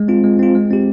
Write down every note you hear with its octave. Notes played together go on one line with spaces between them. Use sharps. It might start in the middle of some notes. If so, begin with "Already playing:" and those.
Already playing: G#3
C4 F4
G#3
C4 F4
G#3
C4 G4